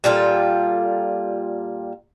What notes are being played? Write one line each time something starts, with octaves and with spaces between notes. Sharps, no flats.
A#2 G3 F4 A4